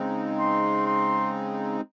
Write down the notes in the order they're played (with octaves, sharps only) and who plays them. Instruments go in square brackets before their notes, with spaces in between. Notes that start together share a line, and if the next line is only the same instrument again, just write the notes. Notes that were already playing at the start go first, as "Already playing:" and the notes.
Already playing: [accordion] C#3 G#3 C4 D#4
[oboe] C6
C6